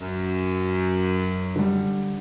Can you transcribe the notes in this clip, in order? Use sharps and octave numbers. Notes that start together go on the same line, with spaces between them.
F#2
D3 G3